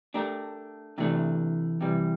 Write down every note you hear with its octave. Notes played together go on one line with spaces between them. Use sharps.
A3 D4 G4 A#4
C3 E3 A3 D4
C3 E3 G3